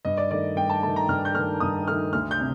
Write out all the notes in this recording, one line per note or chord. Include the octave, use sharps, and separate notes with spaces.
G2 D#5
D5
D#3 A3 D5
G2 G5
A5
D#3 A3 A5
A#5
G2 F6
G6
D#3 A3 F6
G2 D#6
D#3 A3 F6
D2 F6
G6
C3